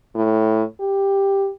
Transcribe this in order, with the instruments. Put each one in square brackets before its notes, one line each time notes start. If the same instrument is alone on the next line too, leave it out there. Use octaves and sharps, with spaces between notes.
[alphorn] A2
G4